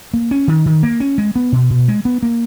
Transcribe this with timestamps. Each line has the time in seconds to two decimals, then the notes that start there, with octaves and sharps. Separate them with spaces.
0.14 A#3
0.31 C#4
0.48 D#3
0.66 D#3
0.83 A#3
1.00 C#4
1.18 G#3
1.36 B3
1.52 B2
1.70 B2
1.88 G#3
2.05 B3
2.23 A#3